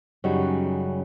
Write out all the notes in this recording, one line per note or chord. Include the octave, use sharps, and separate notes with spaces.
F#2 C#3 F#3 G3 D#4 F#4